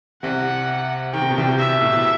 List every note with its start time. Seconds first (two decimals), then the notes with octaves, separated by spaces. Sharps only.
0.23 C2 C3 F#5
1.13 D#3 G5
1.22 C3
1.30 B2
1.38 C2 C3
1.60 E5
1.81 A2
1.93 B2